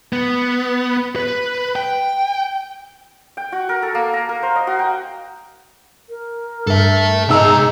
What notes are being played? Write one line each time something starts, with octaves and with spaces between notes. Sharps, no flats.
B3
B4
G5
G5
F#4
A#4
A4
A#3
A#5
A#4
C5
D#5
F#4
G5
A#4
G2 A4 E5
G#2 B2 D#4 A#5 E6